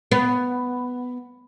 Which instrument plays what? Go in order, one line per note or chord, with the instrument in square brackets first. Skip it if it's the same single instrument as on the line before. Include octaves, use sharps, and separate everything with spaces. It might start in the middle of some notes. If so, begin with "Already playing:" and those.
[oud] B3